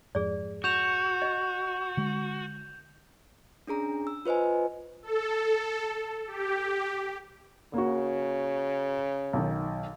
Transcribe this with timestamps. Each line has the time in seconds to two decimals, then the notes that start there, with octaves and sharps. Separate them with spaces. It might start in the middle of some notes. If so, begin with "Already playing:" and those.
0.15 F2 G#2 G#4 D5
0.64 F#4 G6 E7 F7
1.22 D#5
1.97 D3 G#3
3.67 C#4 D4 G#4 A#5
4.07 E6
4.25 F4 B4 C5 D#5 G#5
5.02 A4
6.27 G4
7.74 C#3 A#3 F#4
9.33 B1 D#3